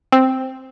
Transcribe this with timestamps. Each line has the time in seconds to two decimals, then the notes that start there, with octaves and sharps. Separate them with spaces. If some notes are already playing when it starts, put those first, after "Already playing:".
0.12 C4